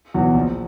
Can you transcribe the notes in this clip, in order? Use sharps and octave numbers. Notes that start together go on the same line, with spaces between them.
E2 B2 F#3
A#1